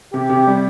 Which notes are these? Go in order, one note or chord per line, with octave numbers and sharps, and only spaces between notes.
C3 G4
C3
G3